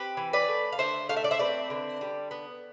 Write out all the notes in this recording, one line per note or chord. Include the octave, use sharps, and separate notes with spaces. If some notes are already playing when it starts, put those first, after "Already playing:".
Already playing: C4 G4 B4
E3
B4 D5
A3
F5
D3 C5 E5
A3 F5
E5
D5
C5 E5
C4 B4 D5
D3
G3
B3